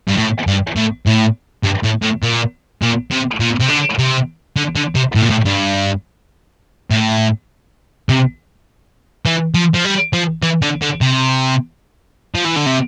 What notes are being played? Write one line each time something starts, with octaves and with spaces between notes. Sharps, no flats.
G2
A2
G2
A2
A2
G2
A2
A2
A#2
A#2
C3
A#2
C3
D3
C3
D3
D3
C3
A2
A#2
A2
G2
A2
C3
E3
F3
F3
G3
F3
E3
D3
D3
C3
F3
E3
D3
C3